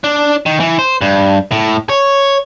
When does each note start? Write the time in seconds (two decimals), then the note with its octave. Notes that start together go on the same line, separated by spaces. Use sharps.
0.04 D4
0.46 D#3
0.60 E3
0.79 C5
1.01 G2
1.52 A2
1.89 C#5